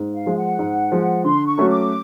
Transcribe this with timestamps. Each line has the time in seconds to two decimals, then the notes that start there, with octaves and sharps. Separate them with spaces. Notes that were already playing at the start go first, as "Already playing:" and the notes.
Already playing: G#2
0.15 F5
0.26 F3 G#3
0.37 F#5
0.59 G#2
0.92 F3 G#3
1.24 D3 C6
1.46 C#6
1.58 F#3 A3 C#4 F#4
1.68 D6